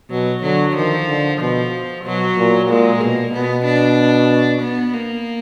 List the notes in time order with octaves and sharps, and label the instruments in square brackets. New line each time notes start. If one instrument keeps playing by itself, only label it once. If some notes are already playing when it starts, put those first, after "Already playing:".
[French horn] B2 [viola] F#3
[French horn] D3 [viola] F#3
[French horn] D#3 [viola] F3
[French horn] D3
[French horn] B2 [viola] F3
[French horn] B2 [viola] F#3
[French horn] A#2
[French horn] A#2 [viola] G#3
[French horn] B2 [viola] A#3
[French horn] B2 [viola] B3
[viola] D4
B3
A#3